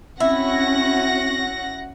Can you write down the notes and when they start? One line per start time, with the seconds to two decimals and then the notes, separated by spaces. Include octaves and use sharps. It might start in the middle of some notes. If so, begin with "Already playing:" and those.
0.20 C4 C#4 E4 F#4 F#5 A#6